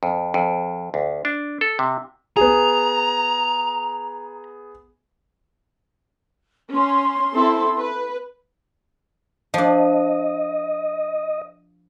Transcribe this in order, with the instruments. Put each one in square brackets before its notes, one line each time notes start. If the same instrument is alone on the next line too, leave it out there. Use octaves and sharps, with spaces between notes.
[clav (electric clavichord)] F2
F2
D2
D4
A4
C3
[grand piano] B3 G#4 [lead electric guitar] A#5
[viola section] C#4 [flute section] C6
[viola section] C4 E4 A4
B4
[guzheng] F3 D4 [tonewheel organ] D#5